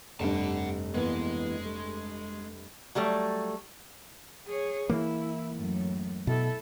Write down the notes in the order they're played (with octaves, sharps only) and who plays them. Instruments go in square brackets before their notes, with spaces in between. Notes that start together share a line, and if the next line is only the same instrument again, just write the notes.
[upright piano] F1 G2 [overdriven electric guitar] F#5 A5
[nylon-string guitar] E3 A#3 B3 [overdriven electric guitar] G#3
[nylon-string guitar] A3
[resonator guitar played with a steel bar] F#3 G3 A3
[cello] G#4 C#5
[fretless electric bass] E3 A#3 [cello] E4
[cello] F#2 A2
[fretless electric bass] B2 [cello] E4 A4